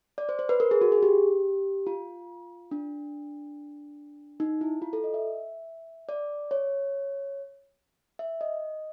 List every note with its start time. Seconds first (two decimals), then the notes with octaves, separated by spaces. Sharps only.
0.18 D5
0.29 C5
0.39 C5
0.49 B4
0.60 A#4
0.71 G#4
0.81 F#4
0.92 G#4
1.03 G4
1.87 F4
2.71 D4
4.40 D#4
4.61 E4
4.82 F4
4.93 A4
5.04 D#5
5.14 E5
6.09 D5
6.51 C#5
8.19 E5
8.41 D#5